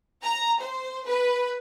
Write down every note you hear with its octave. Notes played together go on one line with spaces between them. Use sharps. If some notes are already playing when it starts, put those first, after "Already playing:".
A#5
C5
B4